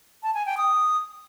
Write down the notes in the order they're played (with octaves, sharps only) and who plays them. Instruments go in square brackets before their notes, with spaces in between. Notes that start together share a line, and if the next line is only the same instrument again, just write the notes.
[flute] A5
G#5
G5
D#6